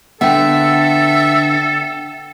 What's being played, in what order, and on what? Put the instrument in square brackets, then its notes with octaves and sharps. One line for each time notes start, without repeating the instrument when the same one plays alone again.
[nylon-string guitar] D3 B3 [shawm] A4 [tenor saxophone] E5 [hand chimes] F#5 G5